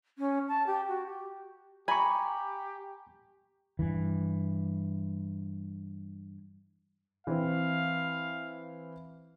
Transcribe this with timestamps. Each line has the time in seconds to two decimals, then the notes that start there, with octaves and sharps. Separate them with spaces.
0.18 C#4
0.48 A5
0.67 G4
0.88 F#4
1.06 G4
1.88 G4 G#5 A#5 B5 C#6
3.79 G2 E3
7.27 E3 C4 F5